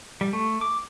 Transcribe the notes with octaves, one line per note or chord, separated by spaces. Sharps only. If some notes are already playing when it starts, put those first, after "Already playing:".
G3
A3
D6